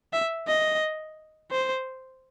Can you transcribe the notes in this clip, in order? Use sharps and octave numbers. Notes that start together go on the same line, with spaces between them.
E5
D#5
C5